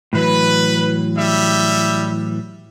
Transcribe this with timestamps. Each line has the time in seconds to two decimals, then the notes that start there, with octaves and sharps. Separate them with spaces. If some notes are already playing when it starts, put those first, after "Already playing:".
0.13 A2 E3 F#3 B4
1.17 G3 E5